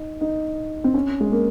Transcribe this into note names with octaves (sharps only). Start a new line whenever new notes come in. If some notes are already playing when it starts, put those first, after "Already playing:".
Already playing: D#4
D#4
C4
C#4
G#3
A#3